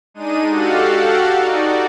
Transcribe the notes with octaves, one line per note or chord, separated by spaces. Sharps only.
G#3 D4 D#4 D#7
F#4 G4 A4 F5 F#5
D#4 F#4 D5